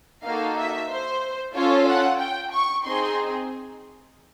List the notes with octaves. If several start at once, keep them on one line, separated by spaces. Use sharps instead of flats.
A#3 D#4 F#4 A4 F5
E5
C5
C#4 F4 A4 C#5
F#5
G5
C#6
C4 D#4 G#4 C6